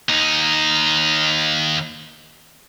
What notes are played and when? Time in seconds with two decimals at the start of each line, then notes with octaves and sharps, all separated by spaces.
0.09 D#2 D#4